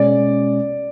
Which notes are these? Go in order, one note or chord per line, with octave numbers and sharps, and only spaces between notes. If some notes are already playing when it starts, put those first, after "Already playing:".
Already playing: B2 G#3 C#4 D5